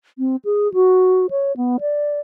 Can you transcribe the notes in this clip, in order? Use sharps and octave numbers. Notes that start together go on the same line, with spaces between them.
C4
G#4
F#4
C#5
B3
D5